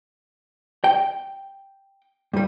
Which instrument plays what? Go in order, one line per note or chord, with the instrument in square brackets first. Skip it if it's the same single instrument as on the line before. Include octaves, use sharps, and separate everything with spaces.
[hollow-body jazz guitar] G5
G2 G3